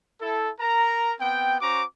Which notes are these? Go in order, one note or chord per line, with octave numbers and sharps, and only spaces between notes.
E4 A4
A#4 A#5
B3 C4 G5
C#4 F#4 C5 A#5 D6